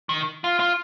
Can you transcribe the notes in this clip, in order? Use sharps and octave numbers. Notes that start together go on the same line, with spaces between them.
D#3
F4
F4